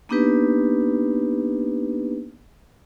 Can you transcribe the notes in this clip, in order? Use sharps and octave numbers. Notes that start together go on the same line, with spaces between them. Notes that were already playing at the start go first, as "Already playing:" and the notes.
A#3 B3 D4 D#4 G4 B4